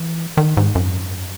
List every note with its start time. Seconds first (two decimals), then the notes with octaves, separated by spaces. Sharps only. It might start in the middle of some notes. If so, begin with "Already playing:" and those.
Already playing: E3
0.37 D#3
0.57 G#2
0.75 F#2